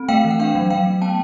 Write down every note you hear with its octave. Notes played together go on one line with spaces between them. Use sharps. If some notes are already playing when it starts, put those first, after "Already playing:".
Already playing: C4
A3 F5 G5
E3
F#5
D4 F5 G5
F#3
F#3 F5 G5
A3
B3 G5 A5